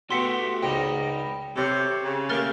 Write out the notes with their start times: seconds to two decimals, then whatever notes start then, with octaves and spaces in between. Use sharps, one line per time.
0.10 A3 B3 F#4 G4 A4 C6 B6 C#7
0.62 C#2 G#2 D#5 G5 B5
1.56 C3 A4 C#5
2.04 C#3
2.29 A3 A#3 G4 A#4 F6 A6